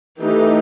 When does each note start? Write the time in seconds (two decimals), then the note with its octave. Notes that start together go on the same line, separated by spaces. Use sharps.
0.19 E3 A3 D#4 G4